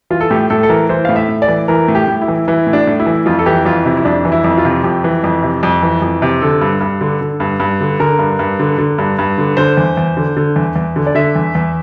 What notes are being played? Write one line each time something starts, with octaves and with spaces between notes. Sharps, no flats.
E3 F4
A4
A2 G4
A2 A4
A4
E3 A#4
E3 C5
A2 F5
E5
A2
D5
E3
E3 A#4
A2
G4
A2
E4
E3
E3 E4
A2
D4
A2
E4
E3
F2 F4
A4
E3 G4
F2 F4
C3 E4
E4
F2 D4
E3
E4
F2
F4
C3
F2 G4
E3
F2
C3
F2
E3
F2
C3
D3 A4
G2
G2
D3
D3
G2
G2
D3
D3 A#4
G2
G2
D3
D3
G2
G2
D3
D3 C5
E2
E2
D3
D3
E2
E2
D3
D5
D3 E5
E2
E2